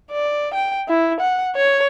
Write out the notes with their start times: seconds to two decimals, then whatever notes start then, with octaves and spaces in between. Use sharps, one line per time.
0.11 D5
0.54 G5
0.88 E4
1.20 F#5
1.56 C#5